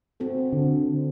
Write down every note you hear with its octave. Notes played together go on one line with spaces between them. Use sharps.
C4 F#4 A4
D3